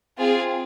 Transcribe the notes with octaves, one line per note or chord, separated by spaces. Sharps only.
C4 F4 G#4